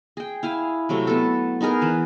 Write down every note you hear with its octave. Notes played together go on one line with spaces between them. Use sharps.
G#4 G5
E4 F5 G#5
C3 F#3 A3
B3 A4
B3 D#4 G#4 A#4
E3 B4